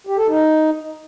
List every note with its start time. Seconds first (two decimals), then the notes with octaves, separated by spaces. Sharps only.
0.07 G4
0.17 A4
0.28 D#4